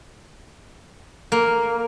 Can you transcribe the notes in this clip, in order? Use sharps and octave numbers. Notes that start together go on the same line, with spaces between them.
A#3